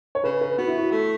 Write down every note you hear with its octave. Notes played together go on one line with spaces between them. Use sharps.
C#5
C#3 B4
B4
B3 F#4
E4
F#4
A3